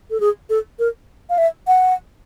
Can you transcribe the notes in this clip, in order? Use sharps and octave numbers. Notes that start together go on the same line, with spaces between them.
A4
G#4
A4
A#4
F5
E5
F#5